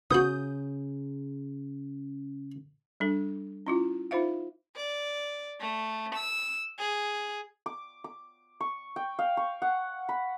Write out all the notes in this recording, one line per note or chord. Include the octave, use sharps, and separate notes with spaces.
C#3 B3 F#4 D#6 G6
G3 D4 A4
C#4 E4 F4
D#4 F4 C5 E5 F5
D5
A3
E6
G#4
D6
D6
C#6
G5
F5
C#6
F#5
B5